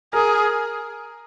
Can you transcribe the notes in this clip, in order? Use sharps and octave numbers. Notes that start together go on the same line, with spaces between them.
G#4 A#4